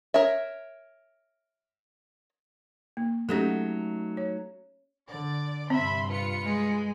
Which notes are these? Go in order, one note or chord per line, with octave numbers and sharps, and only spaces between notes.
A#4 C#5 E5
A#3
F#3 A3 C#4 D#4 G4 A4
C#5
D3 D5
G2 C3 C4 E5 B5 C6
F4 B4 C#7
G#3